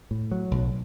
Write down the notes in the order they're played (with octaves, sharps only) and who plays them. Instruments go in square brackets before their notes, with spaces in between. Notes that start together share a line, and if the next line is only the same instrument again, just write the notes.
[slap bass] A2
F#3
B1